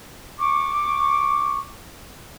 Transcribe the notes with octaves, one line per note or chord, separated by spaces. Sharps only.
C#6 D6